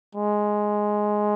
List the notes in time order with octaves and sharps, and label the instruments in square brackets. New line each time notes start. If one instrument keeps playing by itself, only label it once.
[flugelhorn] G#3